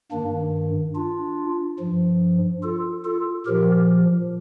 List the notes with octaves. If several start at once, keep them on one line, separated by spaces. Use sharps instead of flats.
G2 D#3 A#3 D4
D4 F4
G2 F3
F4 A4
F4 A4
A#2 F3 G4 A#4